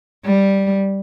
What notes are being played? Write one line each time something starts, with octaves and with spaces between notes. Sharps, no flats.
G3